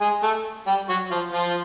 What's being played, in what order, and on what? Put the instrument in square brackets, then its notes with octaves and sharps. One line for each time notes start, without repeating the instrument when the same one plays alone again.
[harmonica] G#3 G#4
A3 A4
G3 G4
F#3 F#4
F3 F4
F3 F4